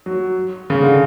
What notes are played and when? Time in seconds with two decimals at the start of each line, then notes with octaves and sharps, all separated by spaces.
0.06 F#3
0.70 C#3
0.82 D3